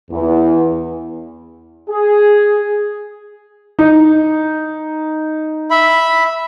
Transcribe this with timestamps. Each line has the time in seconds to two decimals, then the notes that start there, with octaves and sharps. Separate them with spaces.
0.11 E2
1.89 G#4
3.79 D#4
5.71 E5 B5